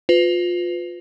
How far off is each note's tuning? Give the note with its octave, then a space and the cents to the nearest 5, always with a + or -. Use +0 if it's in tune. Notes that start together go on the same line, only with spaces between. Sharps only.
F4 +20 B4 +30